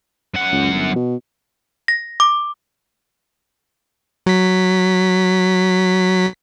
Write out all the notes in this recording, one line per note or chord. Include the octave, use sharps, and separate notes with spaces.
F#2 F#5
C#2
G1
B2
A#6
D6
F#3 B6